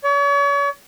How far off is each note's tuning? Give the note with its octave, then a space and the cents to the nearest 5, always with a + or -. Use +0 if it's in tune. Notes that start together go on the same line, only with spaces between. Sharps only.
C#5 +40